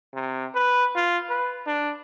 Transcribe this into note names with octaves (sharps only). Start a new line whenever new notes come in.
C3
B4
F4
B4
D4